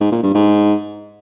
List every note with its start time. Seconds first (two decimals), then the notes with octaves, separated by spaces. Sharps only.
0.01 G#2
0.12 A#2
0.23 G2
0.35 G#2